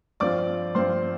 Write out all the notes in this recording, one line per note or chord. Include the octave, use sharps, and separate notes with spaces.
G2 F3 C4 F4 D5 D6
G2 F3 C4 F4 C5 C6